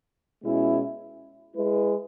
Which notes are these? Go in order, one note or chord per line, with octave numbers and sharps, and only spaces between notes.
B2 G#3 C#4 E4
G#3 E4 G#4 B4